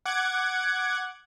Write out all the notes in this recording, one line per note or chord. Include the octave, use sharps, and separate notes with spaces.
F#5 D6 G#6